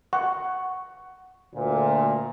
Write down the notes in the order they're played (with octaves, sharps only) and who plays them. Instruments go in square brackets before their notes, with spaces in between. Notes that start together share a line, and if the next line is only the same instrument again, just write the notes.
[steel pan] F#5 [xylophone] C#6
[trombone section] D2 A#2